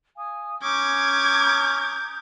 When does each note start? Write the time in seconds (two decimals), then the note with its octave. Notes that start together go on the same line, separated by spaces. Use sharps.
0.16 F5 G#5 D#6
0.63 C#4 A#5 D6 D#6 G6 G#6